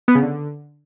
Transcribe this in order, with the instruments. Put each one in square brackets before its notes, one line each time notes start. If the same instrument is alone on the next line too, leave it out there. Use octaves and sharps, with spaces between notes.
[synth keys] B3
C#3
D3